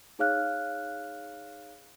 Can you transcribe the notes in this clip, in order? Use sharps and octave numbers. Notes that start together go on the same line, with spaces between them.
D#4 G#4 C#5 F5 F6 F#6